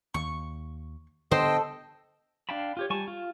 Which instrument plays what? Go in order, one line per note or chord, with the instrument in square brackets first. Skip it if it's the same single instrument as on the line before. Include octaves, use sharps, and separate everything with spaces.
[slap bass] D#2 [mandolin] C#6
[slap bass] D3 B3 [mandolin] A4 [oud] C5 [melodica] D#5 G5
[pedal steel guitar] D4 F5 G5 A5 B5
F4 G4 C#5
G3 G#5 A5 C#6
F4